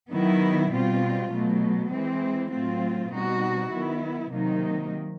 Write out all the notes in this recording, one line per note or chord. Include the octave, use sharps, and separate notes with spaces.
D#3 F#3 B3 E4
B2 G3 C4 F4
B2 F#3 A3
E3 G#3 C4
A2 F#3 A3 C4 F4
B2 G3 C4 D#4 F#4
D#3 F#3 B3 E4
C3 D#3 F#3 A#3 D#4